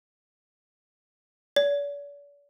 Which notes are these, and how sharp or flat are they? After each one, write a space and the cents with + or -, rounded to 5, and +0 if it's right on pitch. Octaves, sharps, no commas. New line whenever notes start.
D5 -45